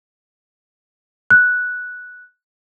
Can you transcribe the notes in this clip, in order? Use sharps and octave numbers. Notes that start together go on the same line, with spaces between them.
F#6